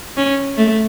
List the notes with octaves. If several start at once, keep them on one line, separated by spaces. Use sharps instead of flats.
C#4
A3